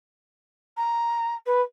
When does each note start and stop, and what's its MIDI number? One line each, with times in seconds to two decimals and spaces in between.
0.76 1.34 82
1.46 1.61 71